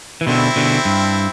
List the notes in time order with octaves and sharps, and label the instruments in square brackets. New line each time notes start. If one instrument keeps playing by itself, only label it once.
[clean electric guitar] E3
[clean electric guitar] B2 D3 [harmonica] C4 E4
[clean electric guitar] B2 D3
G2